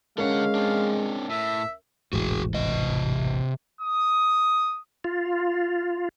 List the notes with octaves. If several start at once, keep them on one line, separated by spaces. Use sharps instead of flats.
D3 G#3 C#4 A#4 F5 F#5
C4 D4
A2 E5
E1 A1 G#2 F#4 G#4
C3 D#5
D#6
F4